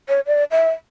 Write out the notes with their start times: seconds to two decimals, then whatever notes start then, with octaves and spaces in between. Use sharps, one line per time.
0.09 C#5
0.26 D5
0.51 E5